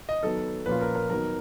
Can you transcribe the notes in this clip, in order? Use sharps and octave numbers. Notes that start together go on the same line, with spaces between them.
D#5
D#3 F#3 B3 A4
A#2 F3 A#3 C#4 F4 B4
A#4
A#4
D#3 F#3 B3 D#4 A#4